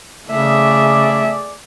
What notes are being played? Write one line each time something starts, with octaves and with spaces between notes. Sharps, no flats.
C#3 A3 G#4 D5 E5